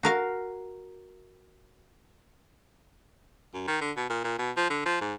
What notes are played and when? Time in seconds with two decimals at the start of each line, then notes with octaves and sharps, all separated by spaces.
0.03 F#4 A#4 F5
3.54 F#2
3.68 D#3
3.81 D3
3.97 B2
4.10 A#2
4.24 A#2
4.39 B2
4.56 F3
4.70 D3
4.86 F3
5.01 G#2